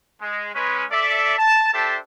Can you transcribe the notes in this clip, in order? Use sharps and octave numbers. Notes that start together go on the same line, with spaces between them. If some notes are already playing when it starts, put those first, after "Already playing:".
G#3
G#3 C#4 B4
A4 D5 E5
A5
D4 G4 A4 C5 E5 A5